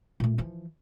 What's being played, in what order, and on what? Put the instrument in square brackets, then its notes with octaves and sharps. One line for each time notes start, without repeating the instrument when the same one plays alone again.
[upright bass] A#2 A3
E3 F3